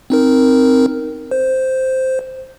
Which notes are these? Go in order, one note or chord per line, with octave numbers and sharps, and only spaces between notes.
C4 D#4 A#4
C5